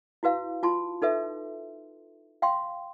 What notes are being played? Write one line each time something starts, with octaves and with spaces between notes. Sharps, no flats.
E4 F#4 B4 F5
F4 A5 C6
D#4 A4 B4 E5
F5 G5 C6